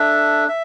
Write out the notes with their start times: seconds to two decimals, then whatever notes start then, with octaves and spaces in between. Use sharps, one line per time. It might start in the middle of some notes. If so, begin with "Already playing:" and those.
Already playing: D4 A4 E5
0.48 E5